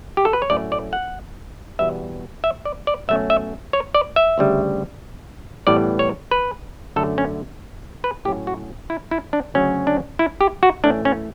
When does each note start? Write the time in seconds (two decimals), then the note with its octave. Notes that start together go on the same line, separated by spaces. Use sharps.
0.17 G4
0.25 A4
0.33 B4
0.42 C#5
0.50 A2 F#3 A3 C#4 D5
0.72 D5
0.93 F#5
1.79 E2 B2 G3 B3 E5
2.44 E5
2.65 D5
2.87 D5
3.08 B2 F#3 A3 C#4 E5
3.30 E5
3.73 C#5
3.94 D5
4.16 E5
4.38 D2 C#3 G3
5.67 A2 E3 G3 B3 D5
5.99 C#5
6.31 B4
6.96 F#2 D3 A3 C#4 A4
7.18 C#4
8.04 B4
8.25 A2 F#3 C#4 G4
8.47 F#4
8.90 E4
9.11 E4
9.33 D4
9.54 D2 C#3 F#3 C#4
9.87 D4
10.19 E4
10.41 G4
10.63 F#4
10.84 A2 E3 A3 C#4 D4
11.05 C#4